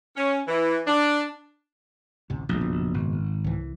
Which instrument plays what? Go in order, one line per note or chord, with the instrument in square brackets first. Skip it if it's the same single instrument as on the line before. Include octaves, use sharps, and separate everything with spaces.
[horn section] C#4
E3
D4
[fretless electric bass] A1 D2 C3
[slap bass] A#1 [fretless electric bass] D#2 B2 G#3
[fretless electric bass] F#1 B2
[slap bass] G#1
[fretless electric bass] C2 E3